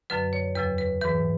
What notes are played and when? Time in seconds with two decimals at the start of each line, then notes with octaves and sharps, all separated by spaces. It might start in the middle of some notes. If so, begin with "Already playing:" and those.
0.10 F#2 D3 F#3 B4
0.33 C#5
0.55 E2 C#3 F#3 B4
0.78 B4
1.01 G#2 E3 B4